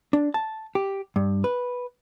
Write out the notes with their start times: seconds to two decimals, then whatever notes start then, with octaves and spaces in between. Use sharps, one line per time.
0.13 D4
0.34 A5
0.75 G4
1.16 G2
1.44 B4